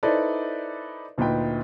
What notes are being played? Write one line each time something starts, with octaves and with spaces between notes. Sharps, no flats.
D#4 E4 A4 B4 C5 D5
D2 A#2 D#4 B4 G5